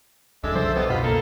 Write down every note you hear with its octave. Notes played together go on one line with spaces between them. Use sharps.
C2 F2 G#3 D4 A4 E5
C#3 F3 G3 C5
B1 B3 G4 A4 D#5
C#2 F#2 B2 F4 D#5 B5
A#3 A4